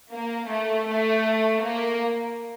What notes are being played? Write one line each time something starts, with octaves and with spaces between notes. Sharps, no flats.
A#3
A3
A3
A#3